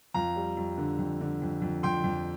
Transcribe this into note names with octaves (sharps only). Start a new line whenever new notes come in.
F2 F5 A#5
G3
F2
D3
F2
D3
F2
F2
F2 G5 C6
F2